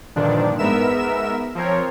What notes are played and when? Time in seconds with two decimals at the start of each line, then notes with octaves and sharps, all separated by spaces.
0.16 G2 A#2 D3 D#3 F3 D4
0.58 G#2 B3 A#4 E5 E6 E7
1.55 F3 C4 A#4 C#5